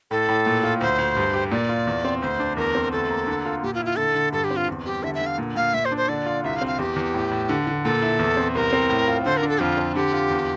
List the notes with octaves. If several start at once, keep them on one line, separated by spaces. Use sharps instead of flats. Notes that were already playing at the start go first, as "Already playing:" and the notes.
A2 A4
A2
A#2
F4
D2 C5
D2
G2
G4
A#2 D5
F4
E2
C4
D2 C5
D4
E2 A#4
C4
D2 A4
A#3
D3
F4
A#2 G4
F4
E4
F4
D3 A4
D3
G2 A4
G4
C4
F4
E2
G3 G4
D3 E5
E5
D3
F5
A#2
A#2 F5
A#2 E5
C5
D4
C5
D3 D5
F4
C2 E5
F5
C4
F5
E2 G4
E2
A2
A2
D3
D3
A#2 A4
E4
E2
C4
C2 A#4
C4
A2
F4
D3 C5
A#4
D4
A4
F2 F4
C4
D3 G4
F4
E2